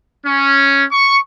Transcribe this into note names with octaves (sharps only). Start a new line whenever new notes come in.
C#4
C#6